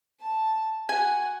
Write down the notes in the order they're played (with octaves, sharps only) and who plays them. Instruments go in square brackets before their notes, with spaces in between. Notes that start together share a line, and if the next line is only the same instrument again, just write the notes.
[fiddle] A5
[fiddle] F#4 F#5 [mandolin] G#5